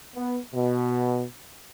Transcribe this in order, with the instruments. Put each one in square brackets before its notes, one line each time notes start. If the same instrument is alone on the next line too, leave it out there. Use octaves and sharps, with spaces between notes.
[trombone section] B3
B2